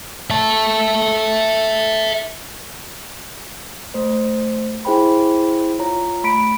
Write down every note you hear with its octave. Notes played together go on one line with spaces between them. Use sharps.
E5 A5
A3 C5
E4 G#4 C5 G5 B5
F4 C#5 A#5
A3 B5 B6 D7